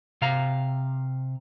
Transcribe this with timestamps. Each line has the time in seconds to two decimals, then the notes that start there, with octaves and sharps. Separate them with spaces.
0.22 C3 F5 A#5